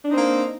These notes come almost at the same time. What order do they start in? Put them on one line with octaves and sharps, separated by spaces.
D4 D#4 C4 A#3